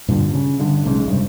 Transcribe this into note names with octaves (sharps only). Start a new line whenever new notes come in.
G2 A#2 D3 G3
C#3
G2 D3
B1 G#2 C#3
F1 G2